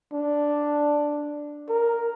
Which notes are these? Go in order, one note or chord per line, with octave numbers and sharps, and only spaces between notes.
D4
A#4